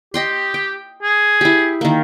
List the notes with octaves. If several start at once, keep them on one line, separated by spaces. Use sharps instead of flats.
G4 D#5 G5 C6
G5
G#4
E4 G4
D#3 A#3